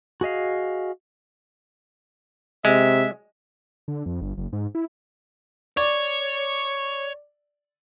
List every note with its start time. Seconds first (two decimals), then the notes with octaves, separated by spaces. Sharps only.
0.21 F#4 G#4 D#5 F5
2.65 C3 G#3 E5
3.88 D3
4.06 F2
4.21 G1
4.38 F#1
4.53 G#2
4.75 E4
5.77 C#5 D5